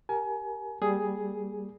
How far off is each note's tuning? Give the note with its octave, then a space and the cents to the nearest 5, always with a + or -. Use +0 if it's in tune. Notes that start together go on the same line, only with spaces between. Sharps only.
G4 -5 A#4 +0 G#5 +30
G3 +0 A#3 +0 G#4 +5